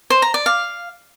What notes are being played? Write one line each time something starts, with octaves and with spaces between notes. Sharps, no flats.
C5
A#5
D5
F5